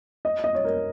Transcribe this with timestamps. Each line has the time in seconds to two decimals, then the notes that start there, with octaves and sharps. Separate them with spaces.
0.25 D#5
0.44 D#5
0.55 C#5
0.64 A#4